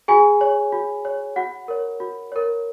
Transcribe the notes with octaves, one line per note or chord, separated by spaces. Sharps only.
F#4 G#4 G#5
C#5
F#4
C#5
F#4 F#5
A#4 C#5
F#4
A#4 C#5